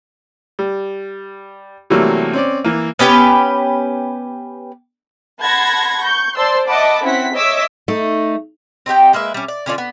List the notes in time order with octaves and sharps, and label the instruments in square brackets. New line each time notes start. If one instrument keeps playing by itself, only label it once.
[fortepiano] G3
C3 E3 F#3 G3 A3 A#3
C4 C#4 D5
E3 A#3
[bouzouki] B3 C#4 G4 B4
[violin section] F#5 A5 B5 C6 G#6 A#6
C#6 G6
C5 D5 A5 C6 E6
D#5 E5 F#5 A5 B5 D6
C4 C#4 E4 F#5 B6
C#5 D#5 E5 D6 E6 B6
[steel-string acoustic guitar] A3 D#4
[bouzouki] C4 D#4 G4 G5
G#3 A#3 B4 E5
G3 C#4
D5
D3 C#4 F4 D5
B3